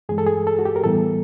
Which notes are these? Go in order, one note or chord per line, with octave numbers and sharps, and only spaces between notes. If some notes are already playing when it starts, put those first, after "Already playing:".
G2 E3 G#3 G#4
A4
G#4
A4
F#4
G4
A#4
A2 E3 G3 B3 A4